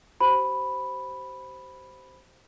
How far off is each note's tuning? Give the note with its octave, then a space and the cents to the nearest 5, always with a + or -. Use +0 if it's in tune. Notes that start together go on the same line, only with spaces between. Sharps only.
G4 -30 C5 +0 B5 +0